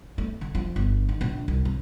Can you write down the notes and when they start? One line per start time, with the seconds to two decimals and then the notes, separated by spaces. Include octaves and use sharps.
0.18 A3
0.41 D3
0.55 F3
0.76 G1
1.09 D#3
1.21 A#1
1.48 C2
1.65 F#3